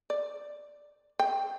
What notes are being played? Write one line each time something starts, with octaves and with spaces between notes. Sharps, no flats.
D5
G5